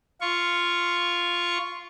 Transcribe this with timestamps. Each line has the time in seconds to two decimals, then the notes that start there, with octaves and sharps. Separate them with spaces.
0.21 F4 C#6